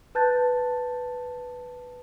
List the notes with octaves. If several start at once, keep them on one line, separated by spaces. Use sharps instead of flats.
B4 A5 F#6 G6 A6